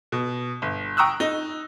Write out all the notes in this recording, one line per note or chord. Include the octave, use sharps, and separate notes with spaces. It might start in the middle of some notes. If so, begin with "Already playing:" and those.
B2
G1
G5 A#5 C#6 D#6 E6 F#6
D#4